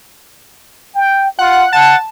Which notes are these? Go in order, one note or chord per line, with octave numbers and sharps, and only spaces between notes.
G5
F4 F#5
F#5 A5